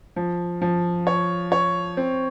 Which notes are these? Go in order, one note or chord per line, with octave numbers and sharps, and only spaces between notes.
F3
F3
C#5
C#5
C4